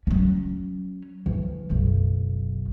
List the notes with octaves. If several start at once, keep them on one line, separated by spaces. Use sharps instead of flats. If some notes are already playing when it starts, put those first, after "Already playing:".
F#3 C#4
E3 F3
F#1 B1